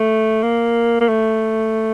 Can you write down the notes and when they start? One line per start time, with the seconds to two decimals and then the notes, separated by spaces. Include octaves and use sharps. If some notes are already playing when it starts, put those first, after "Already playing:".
Already playing: A3
0.43 A#3
1.01 A#3
1.08 A3